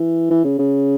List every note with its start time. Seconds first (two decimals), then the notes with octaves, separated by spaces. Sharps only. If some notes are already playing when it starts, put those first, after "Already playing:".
Already playing: E3
0.30 E3
0.44 C#3
0.59 C#3